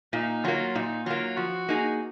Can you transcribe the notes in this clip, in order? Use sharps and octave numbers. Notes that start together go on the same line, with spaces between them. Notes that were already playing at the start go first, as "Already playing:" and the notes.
A#2 D#4
F#3 A#3 F4
A#2 D#4
F#3 A#3 F4
F3 F#4
A#3 D#4 G#4